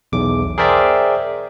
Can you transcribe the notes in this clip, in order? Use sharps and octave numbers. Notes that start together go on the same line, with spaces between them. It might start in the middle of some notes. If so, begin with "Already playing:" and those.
B1 E2 D6
G#4 A#4 C5 D5 E5 G5